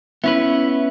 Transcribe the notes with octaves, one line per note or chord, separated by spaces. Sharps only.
B3 C#4 E4 B4